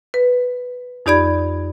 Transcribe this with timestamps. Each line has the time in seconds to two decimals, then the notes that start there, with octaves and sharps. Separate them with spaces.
0.14 B4
1.06 F2 D#4 G4 D5 B5 G#6